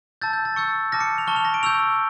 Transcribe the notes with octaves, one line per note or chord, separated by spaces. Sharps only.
A5 E6 G6 A6
G6
A6
C#6 E6 G6 C#7
A5 D6 F6 A#6
C#7
F7
A5 C#6 F6 G7
F7
A#6
D7
C#6 E6 G6 F7